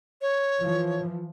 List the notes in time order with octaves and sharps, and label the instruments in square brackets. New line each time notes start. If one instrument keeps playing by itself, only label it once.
[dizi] C#5
[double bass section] E3 F3